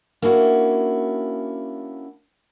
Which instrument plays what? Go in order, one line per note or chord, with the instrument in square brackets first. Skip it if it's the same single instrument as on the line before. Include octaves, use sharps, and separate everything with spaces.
[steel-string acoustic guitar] A#3 C#4 D4 E4 F#4